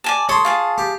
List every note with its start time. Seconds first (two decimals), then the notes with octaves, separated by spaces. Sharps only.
0.04 D5 G#5 A5
0.29 A4 C#5 C6 D#6
0.45 F4 G#4 A5
0.78 G4